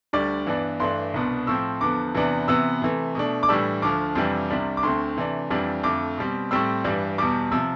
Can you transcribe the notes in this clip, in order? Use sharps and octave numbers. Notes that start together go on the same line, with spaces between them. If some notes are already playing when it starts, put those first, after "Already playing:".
D2 D3 G3 D5
G2 E3 B3 D4
G2 E3 A3 D4 C6
C2 B2 B3 D4
A2 F3 C4 E6
E2 D3 F3 B3 D6
E2 C3 E3 B3 D4
C3 E3 B3 E6
C3 E3 A3
B2 A3 D4
D6
A2 E3 G3 D4 E6
D2 D3 F3 D6
F2 C3 E3 G3 D4
C2 C3 G3 D4
D6
D2 D3 A3 C4 C6
C3 E3 A3 D4
F2 E3 G3 D4
F2 D3 A3 D6
B2 G3 C4
A2 G3 C4 E6
G2 E3 G3 D4
E2 B2 G3 D6
C3 F3 E6